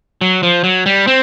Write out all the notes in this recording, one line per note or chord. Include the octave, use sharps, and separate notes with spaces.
F#3
F3
F#3
G3
C4